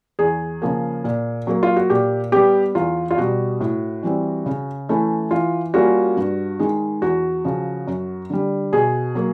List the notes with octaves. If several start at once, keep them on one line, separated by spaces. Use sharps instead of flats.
E2 G#4
C#3 F3 A#3
A#2
F#3 A#3
F4
F#4
A#2 G4
G3 B3 G4
E2 F4
F4
B2 G3 F#4
A2
E3 G3 C4
C#3
E3 A3 C#4 E4
E3 F4
G3 A#3 C#4 F4 F#4
G2
D#3 G#3
E2 F#4
C#3 F3
F#2
D3 G3
B2 G#4
F#3 A#3